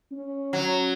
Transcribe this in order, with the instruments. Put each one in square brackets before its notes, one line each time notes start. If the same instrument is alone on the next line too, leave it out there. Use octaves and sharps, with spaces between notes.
[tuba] C#4
[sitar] F#3